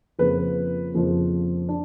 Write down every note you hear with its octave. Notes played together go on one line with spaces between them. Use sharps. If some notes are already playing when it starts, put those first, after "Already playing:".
F2 C#3 F3 A#3 B4
F2 C#3 F3 A#3
D4